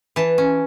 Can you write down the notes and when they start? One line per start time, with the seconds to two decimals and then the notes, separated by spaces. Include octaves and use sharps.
0.16 E3 A5
0.38 C#4